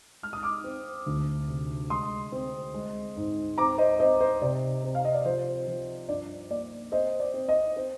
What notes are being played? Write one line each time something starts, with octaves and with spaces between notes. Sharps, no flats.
G#3 F6
D#6
D6 F6
C4
D2
C3
G#3 C6 D#6
C4
G#3
G#2
C4 A#5 D6
C5 D#5
C4 C5 D#5
C5
C3 D5
C4
F5
D#5
D5
F3 C5
F3
G2 D5
A#3 D5
C4 C5 D#5
D5
C4
C5 D#5
C4 C5